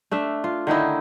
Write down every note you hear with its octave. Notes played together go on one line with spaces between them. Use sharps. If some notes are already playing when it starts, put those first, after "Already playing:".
A3 D4 E5
F4
D3 D#3 D#4 E4